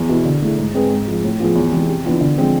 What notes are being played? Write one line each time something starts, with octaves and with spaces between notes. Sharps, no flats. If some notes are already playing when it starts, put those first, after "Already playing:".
Already playing: E2
B2 B3 E4
D3
A3 E4 G#4
G#2
G#3 C4 G#4 B4
G#2
F3 G#3
A2
F3 B3 F4 G#4
E2
C3 E3 G#3
C3
E3 B3 D4 F4
D3
F3 G#3 C4